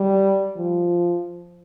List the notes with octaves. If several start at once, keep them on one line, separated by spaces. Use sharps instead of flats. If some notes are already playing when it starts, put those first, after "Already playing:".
Already playing: G3
F3